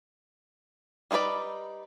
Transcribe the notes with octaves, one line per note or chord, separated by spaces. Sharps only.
G3 D#4 F4 B4 D5